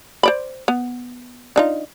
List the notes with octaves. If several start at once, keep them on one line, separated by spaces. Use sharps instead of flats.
C5 D5 B5
B3
D4 D#4 F4